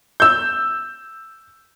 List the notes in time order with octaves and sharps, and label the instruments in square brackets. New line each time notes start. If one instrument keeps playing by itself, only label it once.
[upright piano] E6 G6